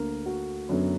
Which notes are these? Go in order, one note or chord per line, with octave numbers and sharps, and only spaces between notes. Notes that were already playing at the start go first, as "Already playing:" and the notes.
Already playing: D2 D3 A#3 A#4
F#4
F#2 D3 F#3 B3